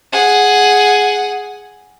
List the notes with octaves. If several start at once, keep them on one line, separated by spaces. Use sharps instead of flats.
G#4 F#5